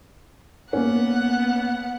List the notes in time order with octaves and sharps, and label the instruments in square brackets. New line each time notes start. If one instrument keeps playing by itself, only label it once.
[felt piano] A#3 C#4 [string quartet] B3 F#5